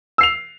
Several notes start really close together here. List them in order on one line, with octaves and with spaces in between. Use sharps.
E6 C7 F7